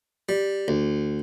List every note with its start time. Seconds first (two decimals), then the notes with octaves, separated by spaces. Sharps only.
0.29 G3
0.68 D2